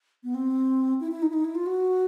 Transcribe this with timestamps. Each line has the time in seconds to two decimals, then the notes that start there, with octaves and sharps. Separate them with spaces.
0.24 B3
0.34 C4
1.00 E4
1.11 E4
1.22 D#4
1.30 E4
1.33 D#4
1.44 E4
1.55 F4
1.66 F#4